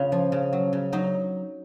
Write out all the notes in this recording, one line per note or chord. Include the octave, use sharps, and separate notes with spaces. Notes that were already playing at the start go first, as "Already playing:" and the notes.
Already playing: C#3 F4
F3
C#3
F#3
C#3
F#3 D#4